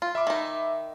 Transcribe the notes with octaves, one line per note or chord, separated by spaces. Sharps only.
F4
E5 B5 D6
D#3 D#4